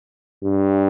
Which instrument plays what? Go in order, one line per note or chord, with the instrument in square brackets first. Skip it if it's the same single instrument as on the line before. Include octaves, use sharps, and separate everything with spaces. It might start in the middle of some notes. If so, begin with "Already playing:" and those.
[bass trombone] G2